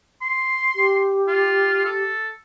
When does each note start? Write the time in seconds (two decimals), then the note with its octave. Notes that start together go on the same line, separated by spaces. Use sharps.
0.22 C6
0.76 G4
1.27 F4
1.85 A4